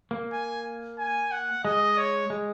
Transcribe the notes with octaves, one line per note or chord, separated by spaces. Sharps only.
A#3
G#5
G#5
F#5
G#3 D#5
C#5
G#3